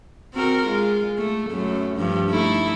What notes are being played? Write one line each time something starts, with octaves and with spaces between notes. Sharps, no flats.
C4 F#4 A#4
G#3 F4
A3
F#2 A3
G2 F3
A3 D#4 E4